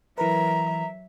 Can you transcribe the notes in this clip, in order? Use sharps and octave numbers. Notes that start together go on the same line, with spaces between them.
E3 F#3 A#4 B4 E5 A#5